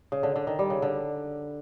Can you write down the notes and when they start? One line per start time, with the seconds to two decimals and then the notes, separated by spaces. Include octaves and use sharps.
0.12 C#3
0.23 D3
0.36 D3
0.47 D#3
0.59 G3
0.70 C#3
0.82 D3